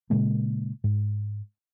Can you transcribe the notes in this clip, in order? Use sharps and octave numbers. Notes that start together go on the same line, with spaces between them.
A#2 C#3 G#3 A#3
G#2